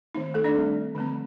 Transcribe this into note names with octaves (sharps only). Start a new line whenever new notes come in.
D#3 A3 C4 D#4
A3 A4
D4 D5
G3 C4
D3 F3 A3 C4